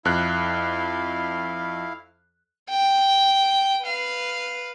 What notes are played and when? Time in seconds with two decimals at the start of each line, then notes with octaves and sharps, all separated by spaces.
0.05 F2 E4 F5 F#6
2.70 G5
3.85 B4 F5